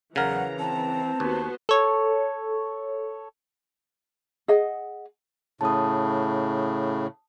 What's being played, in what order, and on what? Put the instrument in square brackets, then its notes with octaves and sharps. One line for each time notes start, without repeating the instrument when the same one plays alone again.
[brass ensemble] E2 F#3 [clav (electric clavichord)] C#3 A#4 [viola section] E3 A#5 [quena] F#5
[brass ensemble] C4 [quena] A5
[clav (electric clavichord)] D#2 [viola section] B3 F#4 C5
[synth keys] A4 C#5
[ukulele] G#4 D#5 F#5
[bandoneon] A2 C#3 [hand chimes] A5 D#6